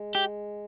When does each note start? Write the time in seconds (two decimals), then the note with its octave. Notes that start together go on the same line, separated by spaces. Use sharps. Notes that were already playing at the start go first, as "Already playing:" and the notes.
Already playing: G#3
0.15 G4